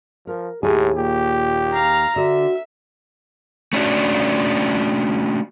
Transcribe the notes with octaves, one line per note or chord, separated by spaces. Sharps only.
F3 A#4
D#2 A2 G4 G#4 G#5
A#2 G4
F5 A#5
D3 F#4 E5
A3 C#4 D4 F#4